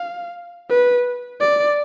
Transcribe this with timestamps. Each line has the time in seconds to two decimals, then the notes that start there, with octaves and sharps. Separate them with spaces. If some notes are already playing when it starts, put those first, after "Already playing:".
Already playing: F5
0.70 B4
1.40 D5